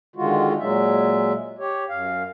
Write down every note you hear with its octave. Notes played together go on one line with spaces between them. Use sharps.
D3 D#3 G#3 F4 F#4
A#2 F#3 G#3 E5
G4 C#5
F#2 F5